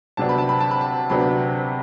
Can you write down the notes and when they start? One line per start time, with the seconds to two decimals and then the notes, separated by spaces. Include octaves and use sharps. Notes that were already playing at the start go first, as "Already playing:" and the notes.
0.17 D2 C3 F#3 B3 D4 A5
0.29 B5
0.38 A5
0.49 B5
0.61 A5
0.71 B5
0.81 A5
1.10 D2 C3 F#3 B3 D4 B5